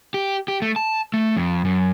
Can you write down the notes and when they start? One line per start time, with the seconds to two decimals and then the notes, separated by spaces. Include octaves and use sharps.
0.14 G4
0.48 G4
0.62 A3
0.76 A5
1.14 A3
1.36 F2
1.65 F#2